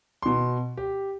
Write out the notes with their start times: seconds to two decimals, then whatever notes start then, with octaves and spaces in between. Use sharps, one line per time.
0.22 B2 C6
0.77 G4